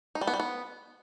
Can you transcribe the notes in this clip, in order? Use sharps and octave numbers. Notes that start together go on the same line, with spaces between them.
D#4
G3
B3
G3
B3